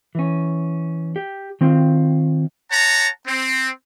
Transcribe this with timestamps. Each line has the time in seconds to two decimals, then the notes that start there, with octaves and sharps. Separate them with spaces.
0.15 E3 C#4
1.16 G4
1.61 D#3 C4 F4
2.70 C#5 F#5 A5 A#5
3.26 C4